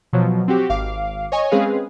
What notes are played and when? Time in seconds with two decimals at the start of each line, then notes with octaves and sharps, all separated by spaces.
0.13 B2 F3 F#3
0.48 C4 F#4 G4
0.69 G#1 F5 D6
1.32 C#5 D#5 G#5 C#6
1.51 G#3 C4 C#4 G#4 B4 F5